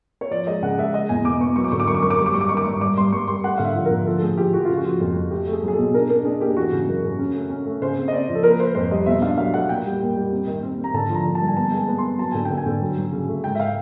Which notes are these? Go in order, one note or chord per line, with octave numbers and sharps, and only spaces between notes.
C#5
F3 D5
G#3 D#5
C#3 F#5
G#3 E5
G#3 D#5
E2 G#5
B2 D6
B3 C#6
F#3 C#6
D6
D3 C#6
D6
F#2 C#6
D6
F#2 C#6
D6
G3 C#6
D6
G2 C#6
D6
D#3 C#6
D6
G2 C#6
G2 D6
G2 C6
G2 C#6
G3 C6
A3 F#5
D3 F5
E5
F3
A#4
D3
F3 A4
A4
A2 G#4
F3 G4
F3 F#4
C#3 F4
F#4
F3
F2
F2
A3 G4
A3 G#4
F#3
G#4
B2 A4
D4 A#4
D4 A#4
D4 G#4
A#3 G4
E3 F#4
C#3
F#2
C#3
C#4
A3
C#4
A3
C#3 C5
C4
D#5
C4 D5
F3
A4
A#3 A#4
B4
A#3 C5
F2 C5
G3 D#5
B2 E5
D4 F5
F#3 F5
A3 F#5
A#2 G5
G3
A#2
G3
C4
D#3
C4
C4
A#5
D3 A5
F3
A#5
D3
A5
G2
G#5
B3 A5
G#3 G#5
A5
B3
C6
B3
F#3 A5
D3 G#5
G5
D3
G#5
D3
F#3
F#3
C#3
A3
G#2 G5
E5
F5